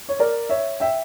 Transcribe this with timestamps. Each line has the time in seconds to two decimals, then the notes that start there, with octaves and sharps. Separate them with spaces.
0.09 C#5
0.19 A#4 D5
0.49 C#5 E5
0.80 E5 G5